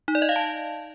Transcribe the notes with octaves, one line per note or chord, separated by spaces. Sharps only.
D#4
D5
D#5
F5
A5